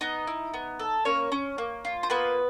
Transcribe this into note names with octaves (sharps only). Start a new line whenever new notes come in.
B3 D#4 D#5
E4
B3
A4
A#3 C#4 C#5
C#4
A#3
F4
C5
A#3 B3 B4